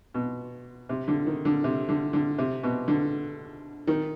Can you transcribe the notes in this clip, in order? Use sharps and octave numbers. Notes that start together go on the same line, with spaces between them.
B2
C3
D3
D#3
D3
C3
D3
D3
C3
B2
D3
D#3